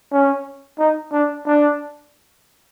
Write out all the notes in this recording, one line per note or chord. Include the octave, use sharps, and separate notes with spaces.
C#4
D#4
D4
D4